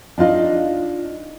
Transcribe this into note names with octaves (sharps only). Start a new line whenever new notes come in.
D4 D#4 F4 D#5